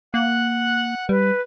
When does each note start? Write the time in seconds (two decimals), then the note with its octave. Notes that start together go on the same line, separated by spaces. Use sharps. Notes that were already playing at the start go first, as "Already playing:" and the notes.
0.14 A#3 F#5 F#6
1.09 G3 B4